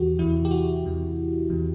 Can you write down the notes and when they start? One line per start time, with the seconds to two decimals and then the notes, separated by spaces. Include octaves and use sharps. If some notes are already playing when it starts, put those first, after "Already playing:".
Already playing: E2 C3 E3 F#4 G4
0.19 E2 C3 E3 E4
0.45 G4
0.51 F#4
0.84 E2 C3 E3
1.49 E2 C3 E3